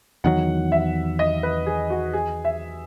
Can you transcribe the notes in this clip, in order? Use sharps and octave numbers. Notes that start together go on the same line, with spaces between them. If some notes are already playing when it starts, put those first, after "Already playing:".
E2 D#3 F#3 F#5
E5
D#5
B4
G#4
F#4
G#4
E5